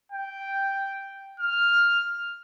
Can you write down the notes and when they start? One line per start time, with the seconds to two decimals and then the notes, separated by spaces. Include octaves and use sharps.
0.12 G5
1.40 F6